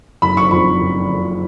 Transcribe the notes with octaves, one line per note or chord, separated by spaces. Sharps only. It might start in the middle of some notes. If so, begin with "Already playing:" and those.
F#1 B5
C#6
F2 B5
F#1
C#3